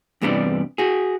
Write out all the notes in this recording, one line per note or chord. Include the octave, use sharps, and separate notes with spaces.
E2 G2 C3 G3 B3 D4
F#4 G#4